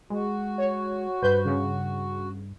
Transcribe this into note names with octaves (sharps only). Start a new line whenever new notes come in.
G#3 F#4
C#5
G2 B4 C5 G6
C#3